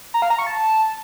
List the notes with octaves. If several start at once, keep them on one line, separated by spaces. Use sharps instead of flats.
A#5
F5
A#5
C#6
A5